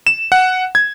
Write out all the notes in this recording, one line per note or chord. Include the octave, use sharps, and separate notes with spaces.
E7
F#5
G#6